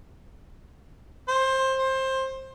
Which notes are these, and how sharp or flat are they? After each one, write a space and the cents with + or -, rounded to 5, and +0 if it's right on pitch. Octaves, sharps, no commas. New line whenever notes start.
C5 +20
C5 +20